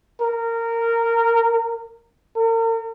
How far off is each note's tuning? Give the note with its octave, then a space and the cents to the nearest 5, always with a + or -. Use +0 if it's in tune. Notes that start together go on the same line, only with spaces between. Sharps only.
A#4 -20
A#4 -40